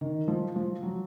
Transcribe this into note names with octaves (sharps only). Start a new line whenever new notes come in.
D#3
F3
F3
F#3